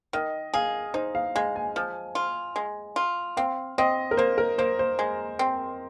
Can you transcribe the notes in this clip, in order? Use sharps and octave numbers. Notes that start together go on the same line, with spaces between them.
D#3 D#5
G#4 F5
D#4 C5
F5
G#3 F5
G#5
F3
F4
G#3
F4
C4 F5
C4 D#5
A#4
A#3 C5
A#4
A#3 C5
C5
G#3
C4